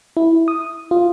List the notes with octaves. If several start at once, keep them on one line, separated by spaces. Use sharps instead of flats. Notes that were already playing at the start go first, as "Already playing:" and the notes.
E4
D#6
F4